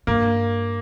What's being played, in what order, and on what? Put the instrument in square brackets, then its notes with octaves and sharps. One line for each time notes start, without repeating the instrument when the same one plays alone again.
[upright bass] G2 [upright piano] A#3